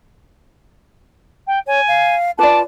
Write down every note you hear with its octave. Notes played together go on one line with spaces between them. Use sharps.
G5
C#5 G#5
F5
F4 B4 D5 A5 D6